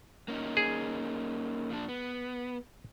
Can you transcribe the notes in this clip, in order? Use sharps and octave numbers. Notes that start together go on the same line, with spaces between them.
A#3 C#4 D#4
G#4
A#2 D4
B3